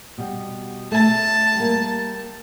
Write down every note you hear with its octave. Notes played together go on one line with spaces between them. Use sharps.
B2 G3
A3 A5
G3 A#3